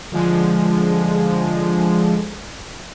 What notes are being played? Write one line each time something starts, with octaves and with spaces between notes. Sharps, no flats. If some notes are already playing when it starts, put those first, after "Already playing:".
D3 F3 G#3